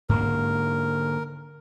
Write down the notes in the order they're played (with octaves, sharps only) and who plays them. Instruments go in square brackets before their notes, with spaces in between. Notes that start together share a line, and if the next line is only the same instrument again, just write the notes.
[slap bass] G#2 D3 A#3 [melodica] A#4